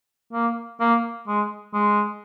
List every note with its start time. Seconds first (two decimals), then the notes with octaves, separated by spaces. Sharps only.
0.33 A#3
0.80 A#3
1.28 G#3
1.74 G#3